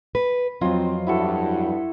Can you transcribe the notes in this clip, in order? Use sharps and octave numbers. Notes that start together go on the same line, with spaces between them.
B4
F2 F#3 C4 F4 D#5
G2 E4 F#4 A4